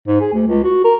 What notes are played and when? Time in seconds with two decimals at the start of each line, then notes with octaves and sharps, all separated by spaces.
0.07 G#2
0.21 G#4
0.33 D2
0.47 C#2
0.63 F#4
0.84 A#4